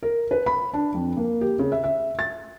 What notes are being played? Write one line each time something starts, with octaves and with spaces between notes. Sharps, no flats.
A#4
B4
B5
D4
F2
A#3
G4
C#3
E5
E5
A6